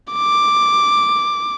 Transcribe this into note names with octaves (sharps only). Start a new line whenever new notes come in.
D6